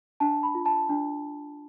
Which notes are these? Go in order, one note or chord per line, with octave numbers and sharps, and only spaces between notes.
D4 A5
B5
F4
A5
D4